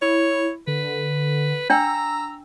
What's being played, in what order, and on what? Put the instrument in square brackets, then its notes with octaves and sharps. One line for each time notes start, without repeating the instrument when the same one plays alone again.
[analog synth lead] E4 [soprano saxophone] C#5
[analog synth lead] D3 [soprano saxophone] B4
[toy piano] D4 C#5 G5 [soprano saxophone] A#5 [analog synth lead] E6